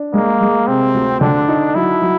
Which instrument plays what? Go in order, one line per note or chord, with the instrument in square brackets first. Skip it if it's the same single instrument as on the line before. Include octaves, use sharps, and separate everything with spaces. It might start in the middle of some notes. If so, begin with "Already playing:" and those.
Already playing: [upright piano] D4
[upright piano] G#3 [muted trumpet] A#3
[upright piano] G#3
[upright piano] C3 [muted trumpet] C4
[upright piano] D2
[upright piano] D3 [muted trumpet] D4
[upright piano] D#4
[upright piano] F#3 [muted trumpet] E4
[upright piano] F#3